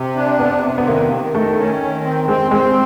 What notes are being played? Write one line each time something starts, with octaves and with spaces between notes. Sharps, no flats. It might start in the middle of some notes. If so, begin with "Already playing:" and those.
Already playing: C3
D4
C3 B3
C3
B3
D#3 A#3
D#3
D#3 A3
C#4
D#3
C4
G#3 C4
G#3 C4